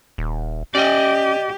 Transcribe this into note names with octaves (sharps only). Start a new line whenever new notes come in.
D#1
C#4 G4 D5 D#5